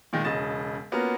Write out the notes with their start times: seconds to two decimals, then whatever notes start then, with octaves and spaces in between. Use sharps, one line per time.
0.13 A#2 D#3 G#3
0.24 E1 C#3 D#5 A6 E7
0.92 A#3 B3 C#4 F4 F#4 A#4